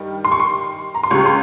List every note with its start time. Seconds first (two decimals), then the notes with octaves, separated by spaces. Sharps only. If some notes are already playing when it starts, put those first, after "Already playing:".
Already playing: G2 D#3 G3
0.25 C6
0.32 C#6
0.40 C6
0.95 A#5
1.03 C6
1.11 C#2 C#3 G3 C#6
1.26 C6